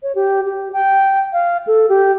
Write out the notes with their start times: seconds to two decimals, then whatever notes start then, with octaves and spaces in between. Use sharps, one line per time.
0.03 C#5
0.15 G4
0.46 G4
0.73 G5
1.33 F5
1.67 A4
1.89 G4